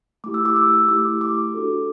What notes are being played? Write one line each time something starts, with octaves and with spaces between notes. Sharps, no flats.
A3 E4 G4 D6
E6
D6
E6
A3 E4 G4 D6
D6
D4 F#4 A4